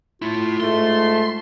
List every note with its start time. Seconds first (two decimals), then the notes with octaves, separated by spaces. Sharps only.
0.22 A3 E4 F4
0.60 G#2 A3 C6